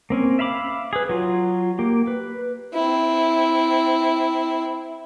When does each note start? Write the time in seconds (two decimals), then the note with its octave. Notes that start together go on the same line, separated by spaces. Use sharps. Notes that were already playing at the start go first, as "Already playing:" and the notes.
0.10 A#3 C4 C#4
0.39 E5 F5 B5 D6
0.93 G#4 B4
1.09 F#3 F4
1.79 A#3 G4
2.07 B4
2.74 C4 E4